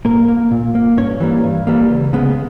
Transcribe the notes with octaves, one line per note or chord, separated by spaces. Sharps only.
A#2 A#3 A#4
A#3
A#2
A#3
G2 C#4 C#5
E3 G3 A#3
G2
E3 G3 A#3
C#2
C#3 G#3 B3